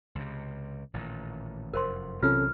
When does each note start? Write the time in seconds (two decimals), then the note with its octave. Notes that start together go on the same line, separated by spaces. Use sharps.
0.15 C#2 C3
0.94 A1 A#2 D#3
1.73 F1 F#2 A#4 C5 C6
2.23 B1 C3 E3 F#3 C#4 F4 A4 F6